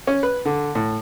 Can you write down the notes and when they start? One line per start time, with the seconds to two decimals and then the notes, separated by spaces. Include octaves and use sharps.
0.07 C#4
0.23 B4
0.45 D3
0.75 A2